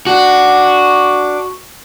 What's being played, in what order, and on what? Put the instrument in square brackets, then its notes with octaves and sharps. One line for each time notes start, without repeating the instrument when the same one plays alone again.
[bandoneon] D4 D6 [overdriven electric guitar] F#4